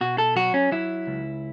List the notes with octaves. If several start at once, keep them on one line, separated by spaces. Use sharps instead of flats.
B2 F#4
A4
F#3 F#4
C#4
F#3 E4
C#2